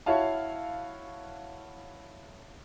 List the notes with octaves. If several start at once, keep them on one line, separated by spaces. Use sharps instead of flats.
E4 F#4 C#5 E5 F5 A5